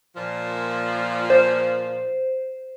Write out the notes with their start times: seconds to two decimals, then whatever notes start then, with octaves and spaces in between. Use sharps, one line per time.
0.17 A#2 F3
1.30 C5